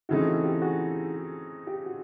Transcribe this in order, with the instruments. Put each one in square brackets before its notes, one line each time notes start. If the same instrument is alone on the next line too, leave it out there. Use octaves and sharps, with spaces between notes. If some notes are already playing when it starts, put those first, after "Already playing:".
[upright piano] C#3 E3 A3 C4 D#4 [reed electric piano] E4 F#4
[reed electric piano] E4 F#4
F4 G4
F#4 G#4
F4 G4
F#4